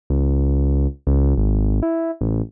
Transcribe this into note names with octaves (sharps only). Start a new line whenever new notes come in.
C#2
C#2
G#1
E4
A1